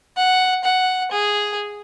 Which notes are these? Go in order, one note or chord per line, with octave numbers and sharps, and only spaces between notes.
F#5
F#5
G#4